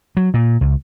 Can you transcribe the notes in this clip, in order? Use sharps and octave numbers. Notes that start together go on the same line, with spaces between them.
F#3
A#2
C#2